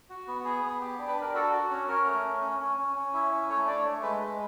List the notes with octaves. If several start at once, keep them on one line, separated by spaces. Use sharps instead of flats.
F#4
B3
G#4
B3
G4
D4
B4
D4 A#4
F#4 A4
F#4
C#4
C#4 A#4
A3
C#4
C#4
C#4
C#4
C#4
E4
C#4
A3 C#5
D4 D5
C#5
A3
G#3 B4
G#3